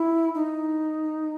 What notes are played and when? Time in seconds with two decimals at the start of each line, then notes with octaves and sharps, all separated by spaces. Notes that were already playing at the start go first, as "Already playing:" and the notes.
Already playing: E4
0.35 D#4